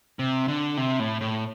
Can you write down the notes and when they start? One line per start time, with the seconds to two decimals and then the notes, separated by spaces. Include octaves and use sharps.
0.19 C3
0.48 D3
0.77 C3
0.99 A2
1.21 A2